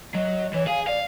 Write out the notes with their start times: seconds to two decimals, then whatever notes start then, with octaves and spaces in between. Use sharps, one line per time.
0.15 F#3 D#5
0.54 E3 C#5
0.67 G#4 F5 G#5
0.88 D5 F5